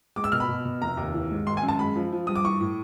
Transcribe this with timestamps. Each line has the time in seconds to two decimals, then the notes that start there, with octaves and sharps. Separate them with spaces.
0.16 G#3 D6
0.24 E6
0.32 B2 F6
0.40 B5
0.48 B2
0.65 B2
0.82 F1 A#5
0.97 D#2
1.14 E3
1.31 G#2
1.46 G#1 C6
1.57 G#5
1.63 F#2
1.68 A5
1.79 G#3 B5
1.96 F3
2.13 F3
2.27 G2 D#6
2.35 D6
2.45 E3 C#6
2.61 A2